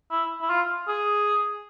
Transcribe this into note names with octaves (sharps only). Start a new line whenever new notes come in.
E4
E4
F4
G#4